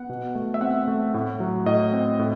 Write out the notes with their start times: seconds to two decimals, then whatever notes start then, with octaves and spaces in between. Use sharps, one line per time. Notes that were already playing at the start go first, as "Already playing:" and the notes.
Already playing: B3 F#5
0.09 B2
0.35 A3
0.54 E5
0.61 C4 F#5
0.88 A3
1.14 A2
1.40 F#3
1.66 A2 D#5
1.93 C4
2.19 A2